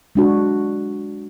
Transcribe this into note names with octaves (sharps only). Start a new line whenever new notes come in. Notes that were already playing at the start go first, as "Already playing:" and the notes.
G#3 D4 F#4